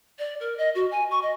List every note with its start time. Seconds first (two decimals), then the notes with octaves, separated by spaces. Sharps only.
0.19 D5
0.40 A#4
0.58 D#5
0.75 F#4
0.91 G#5
1.11 C#6
1.22 D#5